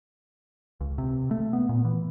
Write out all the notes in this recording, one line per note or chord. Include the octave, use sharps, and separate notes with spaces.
C#2
C3
A3
B3
A#2
E3